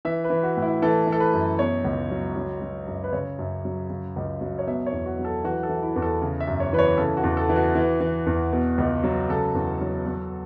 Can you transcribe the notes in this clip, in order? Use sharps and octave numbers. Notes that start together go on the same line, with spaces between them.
E3 E5
B4
E3
F#4
A2
E4
E3 A4
E3
A4
B4
F#2
B2 C#5
C#2
F#3
F#3
F#3
F#2
B4
C#3 C#5
F#2
F#3
C#3
C#2
F#3
C#5
B2 E5
C#5
E2
F#4
F#3
A4
E3 F#4
A4
E3
E4
E2
A4
C#3
E5
F#2
C#5
E3 B4
C#5
C#3 A4
F#4
E2
A4
E3
F#4
E3
E3
E2
B2
C#2
F#3
C#3 A4
E2
F#3
F#3